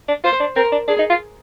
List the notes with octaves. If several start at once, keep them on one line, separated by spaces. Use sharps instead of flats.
D4
F4 C5
D4
C4 A#4
D4
D4 G#4
D#4
F4